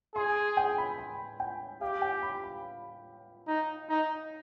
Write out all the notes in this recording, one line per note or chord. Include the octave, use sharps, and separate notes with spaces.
G#4 C6
G5
B5
G#5
G5
G4 F5
G5
B5
B5
D#4
D#4